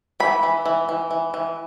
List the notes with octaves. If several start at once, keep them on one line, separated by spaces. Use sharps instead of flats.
E3 B5
E3
E3
E3
E3
E3